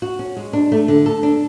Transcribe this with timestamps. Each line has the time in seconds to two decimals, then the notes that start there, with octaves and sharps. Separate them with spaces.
0.02 F#4
0.19 C#4
0.37 G#3
0.53 D4
0.72 A3
0.88 D3
1.06 A4
1.23 D4